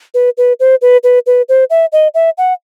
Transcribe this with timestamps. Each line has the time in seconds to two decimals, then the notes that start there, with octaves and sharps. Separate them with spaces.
0.14 B4
0.37 B4
0.60 C5
0.82 B4
1.04 B4
1.26 B4
1.49 C5
1.70 E5
1.92 D#5
2.14 E5
2.38 F#5